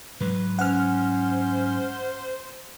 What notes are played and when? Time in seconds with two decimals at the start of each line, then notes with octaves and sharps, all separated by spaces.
0.20 G#2 F#3 G#3 B4
0.59 C#4 C5 F#5 F6